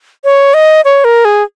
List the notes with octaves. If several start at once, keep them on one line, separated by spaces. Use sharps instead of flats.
C#5
D#5
C#5
A#4
G#4